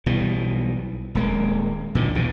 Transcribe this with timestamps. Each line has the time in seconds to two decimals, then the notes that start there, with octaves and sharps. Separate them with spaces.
0.06 B1 B2 E3 G3
1.15 D#1 G#3 A#3
1.95 A#2 D3 D#3
2.15 B1 E2 G#2 B2